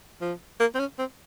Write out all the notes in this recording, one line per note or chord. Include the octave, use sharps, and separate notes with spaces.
F3
A#3
C4
C#4
C4